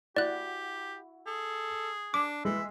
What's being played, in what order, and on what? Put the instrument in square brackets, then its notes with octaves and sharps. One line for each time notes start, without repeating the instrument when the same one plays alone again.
[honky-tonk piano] E4 F#4 [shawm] G4 [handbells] D5 F#6
[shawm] G#4 [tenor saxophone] A4
[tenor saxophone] D4 [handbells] D6
[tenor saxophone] E3 [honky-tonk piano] G#3 [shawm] E5